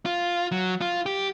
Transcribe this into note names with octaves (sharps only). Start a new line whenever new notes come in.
F4
F#3
F4
G4